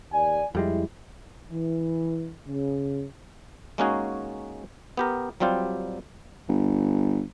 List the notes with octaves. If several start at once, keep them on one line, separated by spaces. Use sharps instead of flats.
D#2 D5 G#5
F2 G3 G#3 E4
E3
C#3
G#3 A#3 C#4 D#4 F#4 G#4
B3 G4 A#4
F#3 G3 C4 F4 G4
G1